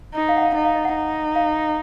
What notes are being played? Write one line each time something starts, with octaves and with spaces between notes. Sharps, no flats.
D#4
F5
F#5
F5
D#4 D#5
F5
D#5
F#5
D#4
F5